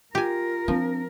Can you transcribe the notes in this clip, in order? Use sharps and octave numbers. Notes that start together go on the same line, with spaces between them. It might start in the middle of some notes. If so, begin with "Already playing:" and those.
F4 G4 A#4 G#5
F3 C4 D4